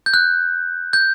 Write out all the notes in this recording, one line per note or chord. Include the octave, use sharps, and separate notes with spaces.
G6
F#6
G6